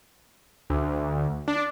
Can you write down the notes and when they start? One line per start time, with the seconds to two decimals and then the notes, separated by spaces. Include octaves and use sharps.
0.70 D2
1.48 D4